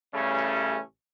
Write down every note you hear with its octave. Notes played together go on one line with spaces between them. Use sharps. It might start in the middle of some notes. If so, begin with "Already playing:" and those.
A1 C#3 G3 A3 C#4